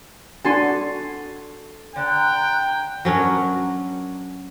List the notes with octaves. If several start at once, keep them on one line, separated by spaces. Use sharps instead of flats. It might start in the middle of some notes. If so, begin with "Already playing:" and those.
D4 F#4 A4 G#5 C6
D3 G5 A#5 F#6
F#3 C#4 D4 A#4